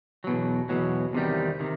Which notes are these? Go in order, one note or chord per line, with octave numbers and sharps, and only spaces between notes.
E2 B2 F#3
E2 B2 F#3
E2 C3 D#3 G3
C3 D#3